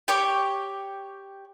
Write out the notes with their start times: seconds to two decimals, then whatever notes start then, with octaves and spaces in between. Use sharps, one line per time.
0.08 G4 C#5 D6